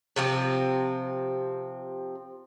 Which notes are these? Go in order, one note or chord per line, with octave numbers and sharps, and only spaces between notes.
C3 F3 C4